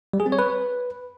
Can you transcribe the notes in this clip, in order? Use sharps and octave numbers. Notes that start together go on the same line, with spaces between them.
G3
G#4
C4
C#5
B4